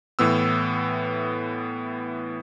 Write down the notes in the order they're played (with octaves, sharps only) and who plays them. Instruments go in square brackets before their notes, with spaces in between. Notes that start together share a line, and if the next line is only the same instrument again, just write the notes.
[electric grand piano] A2 E3 B3 E6